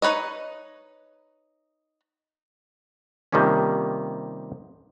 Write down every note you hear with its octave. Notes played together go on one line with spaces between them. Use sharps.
D#4 B4 C#5 D#5
C3 D#3 F3 G3 A#3 C#4